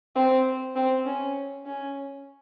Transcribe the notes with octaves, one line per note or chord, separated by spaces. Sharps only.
C4
C4
C#4
C#4